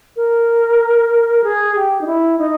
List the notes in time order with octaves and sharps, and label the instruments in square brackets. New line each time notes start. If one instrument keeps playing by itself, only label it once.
[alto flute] A#4
G#4
G4
D#4
E4
D#4